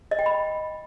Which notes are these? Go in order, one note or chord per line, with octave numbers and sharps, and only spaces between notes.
D#5
G5
B5